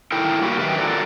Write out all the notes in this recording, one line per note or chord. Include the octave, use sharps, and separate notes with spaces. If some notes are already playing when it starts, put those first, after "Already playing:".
D#3 E4 A4 A#4 G5
G3 A#3 F#4 G4
F#2 D#3 B4 E5 G5
F4 F#4 A4 A#4 D5